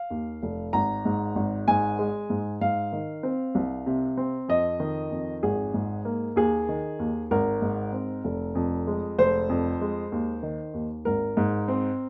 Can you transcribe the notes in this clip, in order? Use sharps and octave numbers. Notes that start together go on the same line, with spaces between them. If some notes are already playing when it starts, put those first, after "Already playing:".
Already playing: F5
D#2
F1
G#1 A#5
G#2
G#1
G#2 G#5
G#3
G#2
G#2 F5
D#3
C4
C2
C3
C4
F2 D#5
D#3
F2
G#1 G#4
G#2
A#3
D#2 G#4
D#3
D#2
G#1 A#4
G#2
C4
F1
F2
G#3
F1 C5
F2
G#3
D#2
D#3
D#2
G#1 A#4
G#2
C4